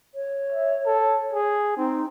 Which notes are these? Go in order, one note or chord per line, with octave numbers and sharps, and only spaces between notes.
C#5
E5
A4
G#4
C4 D#4